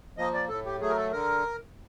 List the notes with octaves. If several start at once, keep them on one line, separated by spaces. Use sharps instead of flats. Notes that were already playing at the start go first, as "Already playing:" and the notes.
F3 A#3 D#5
D5
A2 A4
G4
F#3 A3 G#4
A#4
A4
D3 A#4